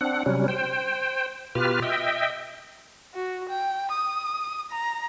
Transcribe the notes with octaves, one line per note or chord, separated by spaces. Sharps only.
C4 D4 F#5
C3 F#3 G3 C#4
C5 G5
B2 F4 G4 B4 F6
D#5 E5 G5
F#4
G5
D#6
A#5